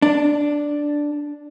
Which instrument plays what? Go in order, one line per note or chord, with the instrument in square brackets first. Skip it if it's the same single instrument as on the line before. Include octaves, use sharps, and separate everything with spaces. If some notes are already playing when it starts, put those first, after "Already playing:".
[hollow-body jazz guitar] D4